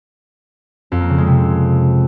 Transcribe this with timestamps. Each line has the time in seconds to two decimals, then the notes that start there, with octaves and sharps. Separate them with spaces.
0.92 F2
1.00 A#3
1.09 C#3
1.18 G#3
1.27 C3